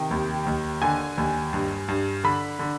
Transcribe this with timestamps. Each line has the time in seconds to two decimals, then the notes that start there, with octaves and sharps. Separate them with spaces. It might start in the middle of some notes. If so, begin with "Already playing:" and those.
Already playing: C3 D#3 G5
0.11 D#2
0.46 D#2
0.82 D3 G#5
1.18 D#2
1.53 G2
1.88 G2
2.24 D3 B5
2.59 D3